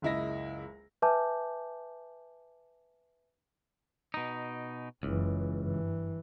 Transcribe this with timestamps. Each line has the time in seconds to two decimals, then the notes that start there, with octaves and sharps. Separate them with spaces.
0.02 F#1 C#2 E4 D#5 A#6
1.02 B4 E5 G#5 A5 D6 G6
4.14 B2 D#4
5.03 F#1 C#2 E3
5.60 G2 E3